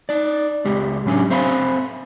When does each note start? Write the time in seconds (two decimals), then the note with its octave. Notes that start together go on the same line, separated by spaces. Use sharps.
0.09 D#4 D5
0.65 C#2 G#3 G4
1.06 A2 F#3 C#4 D4 G#5
1.30 C4 C5 E5 F5 G#5 B5